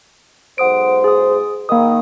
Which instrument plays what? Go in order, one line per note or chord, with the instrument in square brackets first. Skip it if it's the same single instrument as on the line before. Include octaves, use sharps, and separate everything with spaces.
[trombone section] B1 G#2 C5 [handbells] F#5 D#6 D7
[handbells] G#4 D#6
[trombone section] D#3 [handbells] A#3 D#6